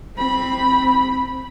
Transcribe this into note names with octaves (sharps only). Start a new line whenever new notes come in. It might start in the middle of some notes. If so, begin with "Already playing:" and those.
C4 B5